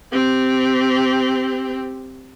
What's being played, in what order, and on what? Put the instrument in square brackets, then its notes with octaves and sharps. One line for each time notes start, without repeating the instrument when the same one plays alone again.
[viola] C4 G4